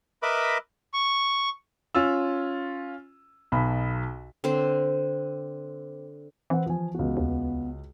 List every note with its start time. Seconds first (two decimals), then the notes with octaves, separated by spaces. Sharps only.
0.23 A#4 B4 D#5 E5 B5 D6
0.94 C#6
1.95 C#4 F4 E6
3.52 B1 B2 B5
4.44 D3 C4 C5
6.50 E3 C4 B4 F#5
6.66 F3 G#5
6.94 C#2 B3 F#4
7.17 D#2